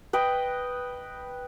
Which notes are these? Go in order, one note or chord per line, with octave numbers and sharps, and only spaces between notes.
B4 D#5 G5